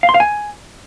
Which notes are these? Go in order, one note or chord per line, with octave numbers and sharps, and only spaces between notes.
F5
C6
F5
G#5